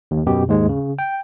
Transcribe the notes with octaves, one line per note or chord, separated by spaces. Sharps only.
D#2
F#2 B2 G4
D#2 G#2 G#3
C#3
G5